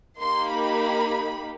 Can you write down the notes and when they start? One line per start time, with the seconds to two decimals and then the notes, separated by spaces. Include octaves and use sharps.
0.20 A#3 D#4 G4 C6
0.51 B5